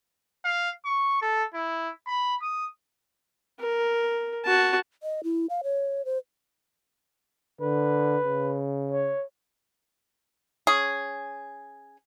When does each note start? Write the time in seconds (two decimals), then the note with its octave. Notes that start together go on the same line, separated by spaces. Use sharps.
0.45 F5
0.85 C#6
1.22 A4
1.54 E4
2.07 B5
2.42 D#6
3.60 A#4
4.45 F#4 A5
5.03 D#5
5.24 E4
5.50 F5
5.63 C#5
6.05 C5
7.61 D3 B4
8.24 C#3
8.91 C#5
10.67 C#4 G#4